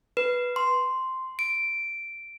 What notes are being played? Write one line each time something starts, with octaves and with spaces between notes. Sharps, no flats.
B4
C6
D7